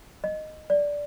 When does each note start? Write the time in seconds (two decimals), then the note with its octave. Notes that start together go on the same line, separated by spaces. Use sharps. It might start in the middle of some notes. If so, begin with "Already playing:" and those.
0.24 D#5
0.70 D5